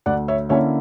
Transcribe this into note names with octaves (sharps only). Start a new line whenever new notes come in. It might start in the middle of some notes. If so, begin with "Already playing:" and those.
D2 D5 F#5
C#5 E5
D3 A#3 C#4 E4 C#5 E5